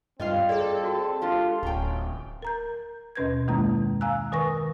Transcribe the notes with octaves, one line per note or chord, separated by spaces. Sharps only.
G2 G3 C4 F4 D#5 F5
G#4 A4 D5
F#4
G#3 D4 F4 G4
D1 C#4 G5 A#5
A#4 A#5 G6
D#2 B2 C#4 B4 G6 G#6
F#2 D#3 G#3 A#3 E4 A#5
F5 G#5 A#5 E6 F#6
D#3 A#4 B4 G#5 C#6 A#6